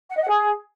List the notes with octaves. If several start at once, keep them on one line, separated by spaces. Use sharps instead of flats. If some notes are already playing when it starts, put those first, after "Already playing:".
F#5
D#5
F#5
G#4